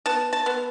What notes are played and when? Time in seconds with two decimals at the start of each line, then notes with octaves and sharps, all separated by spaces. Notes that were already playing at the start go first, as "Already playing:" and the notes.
0.06 B3 A5
0.33 A5
0.46 B3